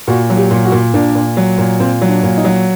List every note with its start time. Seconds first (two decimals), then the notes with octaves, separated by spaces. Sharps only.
0.07 A#2 F#4
0.30 F#3
0.37 G4
0.51 A#2
0.65 F#4
0.72 A#2
0.94 A#2 D4
1.15 A#2
1.37 F#3
1.58 A#2
1.80 A#2 C4
2.01 F#3
2.08 D4
2.23 A#2
2.37 D#4
2.44 F#3